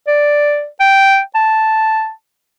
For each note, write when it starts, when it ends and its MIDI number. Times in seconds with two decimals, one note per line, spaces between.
0.08 0.66 74
0.80 1.20 79
1.35 2.10 81